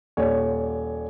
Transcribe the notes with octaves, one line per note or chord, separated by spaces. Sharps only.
D#1 C#5 D5